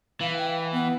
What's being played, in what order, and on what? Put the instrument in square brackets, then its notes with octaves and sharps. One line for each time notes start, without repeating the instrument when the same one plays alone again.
[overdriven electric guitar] E3 [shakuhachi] F5
[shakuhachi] G5
B3